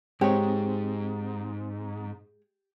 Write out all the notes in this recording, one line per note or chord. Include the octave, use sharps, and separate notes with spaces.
G#2 G#3 C4 G4 C#5